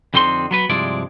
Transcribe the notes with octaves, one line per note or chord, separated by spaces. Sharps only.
F2 D3 C4 D#4 C6
F#3 B3 B4
G2 C3 F3 G#3 E4 D5